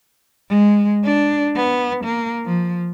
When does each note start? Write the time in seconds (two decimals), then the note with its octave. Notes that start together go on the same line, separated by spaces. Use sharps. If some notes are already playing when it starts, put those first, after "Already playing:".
0.50 G#3
1.05 D4
1.56 B3
2.05 A#3
2.45 F3